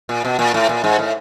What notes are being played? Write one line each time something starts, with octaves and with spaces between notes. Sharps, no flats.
A#2
B2
A#2
A2
A#2
G#2
A2